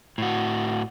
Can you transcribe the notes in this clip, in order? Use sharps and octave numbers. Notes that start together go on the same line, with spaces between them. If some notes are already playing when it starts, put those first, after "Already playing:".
A2 F#4